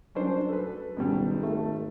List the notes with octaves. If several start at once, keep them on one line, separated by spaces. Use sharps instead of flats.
F#3 C#4 D4 C5
A4 B4
G#1 F#2 B2 G3
A3